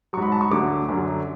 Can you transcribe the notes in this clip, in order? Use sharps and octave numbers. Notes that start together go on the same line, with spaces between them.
G#2 F#3 C#6
B5
A5
C#6
D2 D3 F#3 D6
F#2 D3 F#3